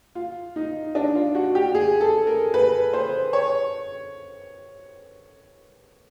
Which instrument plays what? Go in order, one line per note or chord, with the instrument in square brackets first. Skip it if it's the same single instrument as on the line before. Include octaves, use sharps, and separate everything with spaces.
[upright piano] F4
D#4
D4
F4
F#4
G4
G#4
A4
A#4
B4
C5
C#5